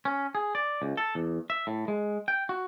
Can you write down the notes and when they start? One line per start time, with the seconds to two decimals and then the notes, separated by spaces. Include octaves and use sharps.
0.05 C#4
0.35 G#4
0.55 D5
0.82 C#2
0.97 A4
1.15 E2
1.50 E5
1.67 A2
1.88 G#3
2.28 G5
2.49 F#4